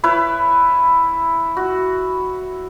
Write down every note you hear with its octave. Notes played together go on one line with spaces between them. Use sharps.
E4 B4 C#5
F#4